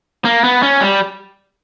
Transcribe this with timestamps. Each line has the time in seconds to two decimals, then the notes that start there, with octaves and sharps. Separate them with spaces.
0.25 A#3
0.44 B3
0.62 C#4
0.81 G3